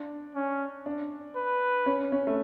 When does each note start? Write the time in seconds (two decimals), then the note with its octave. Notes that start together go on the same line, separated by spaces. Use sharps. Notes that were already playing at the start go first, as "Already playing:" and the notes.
Already playing: D4
0.35 C#4
0.86 D4
1.36 B4
1.86 C#4
2.12 C#4
2.27 A3